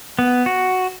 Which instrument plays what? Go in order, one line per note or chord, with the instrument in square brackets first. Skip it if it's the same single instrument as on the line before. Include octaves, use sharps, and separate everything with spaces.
[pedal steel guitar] B3
F#4